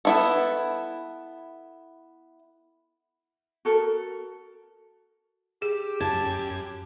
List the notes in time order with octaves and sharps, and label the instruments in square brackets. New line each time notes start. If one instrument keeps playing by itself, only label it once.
[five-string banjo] B3 E4 A4
[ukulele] F#4 A4 A#4
[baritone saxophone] G4 [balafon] G#4
[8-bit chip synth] F#2 G#6 [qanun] A5